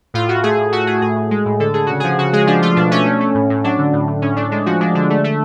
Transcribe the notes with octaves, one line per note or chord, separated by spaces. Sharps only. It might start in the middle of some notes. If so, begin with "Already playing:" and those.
A2 F4
A2 F#4
A3 G#4
A2
A3 F#4
A3 G#4
A2 G#4
A2
G#3
A2
D3 A4
D3 G#4
C#3 F#4
F3 G#4
C#3 F#4
G#3 G#4
F3 D4
A3 F4
B2 D4
A3 C#4
A3
A3
A2
A2
F#3 D4
D3
A2
A2
A2 C#4
A3 D4
G#3 D4
F3 F#4
G#3 D4
D3 D4
A3
A3